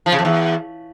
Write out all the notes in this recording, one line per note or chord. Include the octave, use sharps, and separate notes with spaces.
F3
C#3
F2
E2